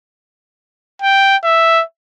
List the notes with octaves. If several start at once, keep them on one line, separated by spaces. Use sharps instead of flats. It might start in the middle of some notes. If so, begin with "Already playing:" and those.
G5
E5